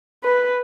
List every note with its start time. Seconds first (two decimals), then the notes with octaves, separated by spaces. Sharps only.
0.24 B4